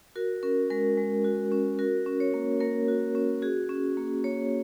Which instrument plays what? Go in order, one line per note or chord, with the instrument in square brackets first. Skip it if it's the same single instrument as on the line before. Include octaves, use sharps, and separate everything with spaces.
[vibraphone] F#4 A#4
C#4 A#4
G#3 A#4
G#3
F#4
C#4
F#4 A#4
C#4
C#5
A#3
A#3 A#4
F#4
C#4
F#4 G#4
C#4
A#3
A#3 C#5